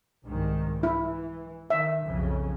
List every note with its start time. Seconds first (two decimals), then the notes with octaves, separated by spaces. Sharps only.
0.24 C2 G#2 D#3
0.83 E3 E4
1.70 D#3 E5
2.06 B1 F2 C#3